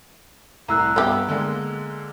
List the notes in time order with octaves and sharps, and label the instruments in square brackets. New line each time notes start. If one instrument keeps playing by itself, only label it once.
[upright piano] C2 A2 [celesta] A#5 E6 F#6
[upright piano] G2 E5 [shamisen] B3 G4
[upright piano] D3 G#3 A#3